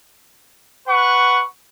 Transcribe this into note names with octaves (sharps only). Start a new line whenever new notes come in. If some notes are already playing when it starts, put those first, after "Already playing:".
B4 F#5 C#6